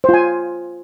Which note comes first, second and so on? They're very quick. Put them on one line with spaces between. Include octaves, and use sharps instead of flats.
C5 F4 G#5